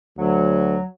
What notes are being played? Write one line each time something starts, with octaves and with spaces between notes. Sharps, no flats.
D2 F#3